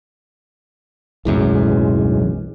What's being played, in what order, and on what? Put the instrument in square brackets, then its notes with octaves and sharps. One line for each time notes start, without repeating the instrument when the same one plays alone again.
[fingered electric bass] D1 B1 F#2 [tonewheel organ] E3 G#3